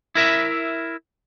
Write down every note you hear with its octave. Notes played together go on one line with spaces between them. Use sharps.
E4 A#4 E5